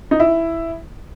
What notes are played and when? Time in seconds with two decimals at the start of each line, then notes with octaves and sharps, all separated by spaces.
0.11 D#4
0.20 E4